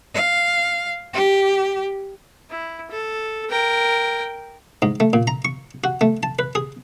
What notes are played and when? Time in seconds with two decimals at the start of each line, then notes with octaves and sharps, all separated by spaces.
0.14 F5
1.13 G4
2.50 E4
2.91 A4
3.49 A#4 G5
4.82 G#2
5.00 A3
5.13 A#2
5.27 A#5
5.45 C#6
5.84 F#4
6.01 A3
6.23 A5
6.39 B4
6.55 G#4